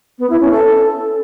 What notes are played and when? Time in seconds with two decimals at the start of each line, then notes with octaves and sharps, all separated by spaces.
0.19 B3
0.30 E4
0.40 C#4
0.51 A4